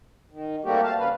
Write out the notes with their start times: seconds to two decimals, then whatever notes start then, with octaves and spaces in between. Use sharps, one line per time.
0.31 D#3
0.64 G3 A3 A#3 C4 F#4 G4
0.83 F5 A5
0.98 C#3 B4 F5